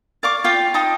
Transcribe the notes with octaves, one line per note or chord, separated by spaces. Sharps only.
D5 F5 C#6 D6
F4 F5 G5
D#4 G5 A5 D#6